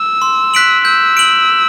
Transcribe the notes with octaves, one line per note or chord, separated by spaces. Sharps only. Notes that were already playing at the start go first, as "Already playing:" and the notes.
Already playing: E6
C6
F#6 B6 D7 F#7
E6 G6
D7 F#7